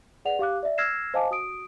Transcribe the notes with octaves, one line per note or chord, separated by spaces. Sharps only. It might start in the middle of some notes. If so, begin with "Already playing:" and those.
G#4 B4 D5 F#5 F7
G4 F5 D6 F#6
D5 E5
E6 F6 G#6 A#6 C7 E7
C5 D#5 F5 G#5 A5 D6
F#4 D#6 D7